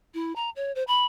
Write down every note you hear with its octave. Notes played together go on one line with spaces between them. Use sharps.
E4
A#5
C#5
C5
B5